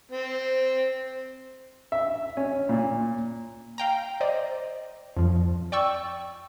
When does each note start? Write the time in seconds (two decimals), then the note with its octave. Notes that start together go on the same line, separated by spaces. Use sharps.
0.11 C4
1.92 E5
2.37 C#4
2.69 A#2
3.78 F5 G5 A#5
4.20 C5 D5 D#5
5.17 F2 F3
5.72 D5 G5 C#6 E6